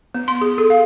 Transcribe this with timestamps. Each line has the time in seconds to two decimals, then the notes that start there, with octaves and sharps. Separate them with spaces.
0.14 B3
0.28 C6
0.41 G#4
0.58 A4
0.70 F5